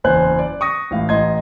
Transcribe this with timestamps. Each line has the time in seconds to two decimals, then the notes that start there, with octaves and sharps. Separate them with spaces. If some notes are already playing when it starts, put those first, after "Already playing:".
0.04 F#1 E2 C5 G#5 F#6
0.39 D5
0.61 C#6 D#6 A#6
0.91 A1 A2 F5
1.09 A1 D#5 A#5 C6 G#6